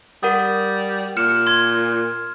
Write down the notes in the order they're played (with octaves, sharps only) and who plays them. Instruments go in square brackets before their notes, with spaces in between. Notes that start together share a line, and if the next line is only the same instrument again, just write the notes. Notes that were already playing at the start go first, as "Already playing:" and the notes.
[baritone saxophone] G3 [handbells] A#4 F#5 D#6
[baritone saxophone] A#2 [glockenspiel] F6 C#7 E7
[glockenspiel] C6 G#6